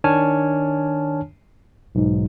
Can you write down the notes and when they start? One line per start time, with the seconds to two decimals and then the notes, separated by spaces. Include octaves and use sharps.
0.04 D#3 D4 C#5 G#5 A5 F6
1.95 B1 G#2